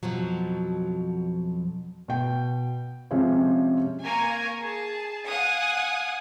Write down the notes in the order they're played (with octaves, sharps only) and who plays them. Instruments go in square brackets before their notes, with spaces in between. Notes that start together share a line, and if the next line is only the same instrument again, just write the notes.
[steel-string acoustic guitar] F2 B2 F3 F#3
[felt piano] B2 G5
C3 F3 G#3 C4 C#4
[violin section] A#3 A#4 G#5 A#5 C#6 G#6
G#4 A5
F5 F#5 G#5 D#6